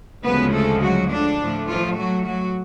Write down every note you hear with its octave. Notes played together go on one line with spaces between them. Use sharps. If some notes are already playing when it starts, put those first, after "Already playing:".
D2 C#3 F3 G#3 B3 B4
A3 A4
F#3 F#4
D3 D4
A2 F3 A3
F3 F4
F#3 F#4
F#3 F#4